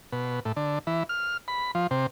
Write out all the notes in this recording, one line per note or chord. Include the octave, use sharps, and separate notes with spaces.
B2
A2
D3
E3
F6
B5
F3
C3